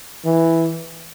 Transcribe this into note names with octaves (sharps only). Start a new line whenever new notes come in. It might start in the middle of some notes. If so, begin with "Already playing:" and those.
E3